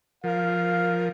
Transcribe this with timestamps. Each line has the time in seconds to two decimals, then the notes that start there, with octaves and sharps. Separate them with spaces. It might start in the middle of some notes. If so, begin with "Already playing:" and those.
0.24 F3 A#4 F5